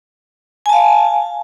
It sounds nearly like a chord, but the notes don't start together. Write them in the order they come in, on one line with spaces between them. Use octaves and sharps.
G#5 A5 F5